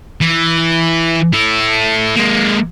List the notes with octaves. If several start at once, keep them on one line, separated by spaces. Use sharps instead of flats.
E3
E4 A4
G#3 A#3